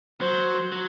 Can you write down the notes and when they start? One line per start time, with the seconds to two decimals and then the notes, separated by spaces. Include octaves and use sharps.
0.21 F#3 C5
0.72 F#3